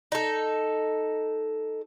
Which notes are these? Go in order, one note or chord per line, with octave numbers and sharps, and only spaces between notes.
D#4 A4